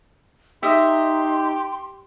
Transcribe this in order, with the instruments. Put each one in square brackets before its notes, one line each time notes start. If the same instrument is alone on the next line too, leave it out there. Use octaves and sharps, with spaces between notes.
[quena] D#4 [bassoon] G4 [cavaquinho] D#5 E5 [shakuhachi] C6